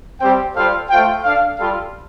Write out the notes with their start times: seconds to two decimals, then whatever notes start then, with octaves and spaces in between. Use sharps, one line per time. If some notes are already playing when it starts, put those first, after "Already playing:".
0.20 G3 C4 G4 C5 G5
0.54 G3 F4 A4 C5 F5
0.89 A3 F4 C5 G5
1.24 D4 A4 F5
1.57 G3 F4 A4 F5